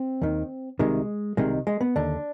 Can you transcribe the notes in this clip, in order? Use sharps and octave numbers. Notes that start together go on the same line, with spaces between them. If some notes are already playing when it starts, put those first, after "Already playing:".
Already playing: C4
D#2 D#3
C2 C3 D#3 G#3
C2 C3 D#3 G#3
G#3
B3
D#2 D3 D4